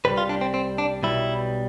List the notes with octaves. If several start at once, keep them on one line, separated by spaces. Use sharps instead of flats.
C2 B2 G3 B4
F4
D4
C4
C4
D4
B1 B2 G3 E4